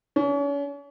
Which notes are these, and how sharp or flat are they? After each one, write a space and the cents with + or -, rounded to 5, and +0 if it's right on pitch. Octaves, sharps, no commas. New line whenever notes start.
C#4 +40